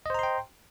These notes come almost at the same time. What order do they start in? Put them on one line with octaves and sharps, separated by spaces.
D#5 C5 A#5 C6 G5